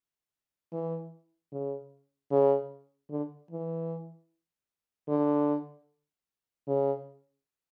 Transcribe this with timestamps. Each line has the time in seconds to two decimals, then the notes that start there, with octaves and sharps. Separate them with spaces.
0.72 E3
1.52 C#3
2.31 C#3
3.10 D3
3.51 E3
5.08 D3
6.67 C#3